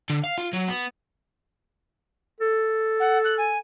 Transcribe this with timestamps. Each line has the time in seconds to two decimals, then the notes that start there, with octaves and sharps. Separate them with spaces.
0.10 D3
0.24 F5
0.38 F4
0.53 F#3
0.69 B3
2.40 A4
3.00 F#5
3.24 F#6
3.37 G#5